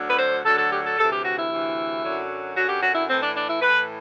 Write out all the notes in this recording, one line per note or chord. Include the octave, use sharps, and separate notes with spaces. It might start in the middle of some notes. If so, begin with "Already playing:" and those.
Already playing: D2 D3 F#3
B4
C5
D2 D3 F#3 A4
A4
G4
A4
D2 C3 E3 A4
G4
F#4
E4
D2 C3 E3
F#2 D3 F#3
F#2 D3 F#3 F#4
G4
F#4
E4
A2 E3 C4
D4
D4
E4
A2 E3 B4